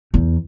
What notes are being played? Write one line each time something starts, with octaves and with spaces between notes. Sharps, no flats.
E2